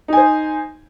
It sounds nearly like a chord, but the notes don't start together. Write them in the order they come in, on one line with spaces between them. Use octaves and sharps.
D#4 G#5 C5